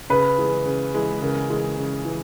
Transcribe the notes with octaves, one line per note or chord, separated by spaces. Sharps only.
C#3 B4
E3 G#3
C#3
E3 G#3
C#3 A#4
E3 G#3
C#3
E3